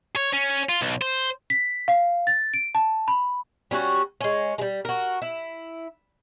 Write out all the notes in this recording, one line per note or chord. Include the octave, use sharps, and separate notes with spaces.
C#5
C#4
F4
B1
C5
B6
F5
A6
D7
A5
B5
G3 C#4 E4 F#4
G#3 C#4
G3 G#3
F#4 A#4
E4